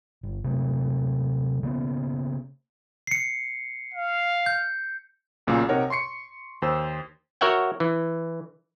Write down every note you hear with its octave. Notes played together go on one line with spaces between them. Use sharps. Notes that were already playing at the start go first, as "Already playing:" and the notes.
G1
C3 F#3 A3
C#3 A#3 B3
C7 C#7
F5
G6
B1 A#2 C#3 A#3
C3 D#4 A#4 C#5 F#5
C6 C#6 C7 C#7
D#2 C5 E6
F#4 A#4 C#5 E5 F#5 G5
E3